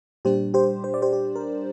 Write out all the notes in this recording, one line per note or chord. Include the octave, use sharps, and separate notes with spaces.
A#2 G3 D4 G4 C5
G4 C5
C5
D5
G4 C5
G4
A#4